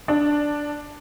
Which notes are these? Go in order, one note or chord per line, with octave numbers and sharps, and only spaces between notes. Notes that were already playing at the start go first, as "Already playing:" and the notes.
D4